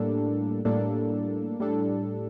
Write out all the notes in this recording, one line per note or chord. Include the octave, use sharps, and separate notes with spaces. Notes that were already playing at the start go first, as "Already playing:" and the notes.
Already playing: A2 G3 A#3 D4 A4
A2 G3 A#3 D4 A4
A2 G3 D4 A4